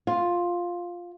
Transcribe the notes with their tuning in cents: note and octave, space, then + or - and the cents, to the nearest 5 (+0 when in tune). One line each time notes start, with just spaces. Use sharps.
F4 +5